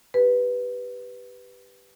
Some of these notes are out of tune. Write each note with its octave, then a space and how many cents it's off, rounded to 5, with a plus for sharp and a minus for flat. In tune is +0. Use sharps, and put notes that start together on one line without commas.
G4 +0 B4 +0